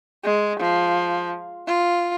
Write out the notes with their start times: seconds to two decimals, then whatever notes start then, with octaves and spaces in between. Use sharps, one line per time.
0.24 G#3
0.59 F3
1.67 F4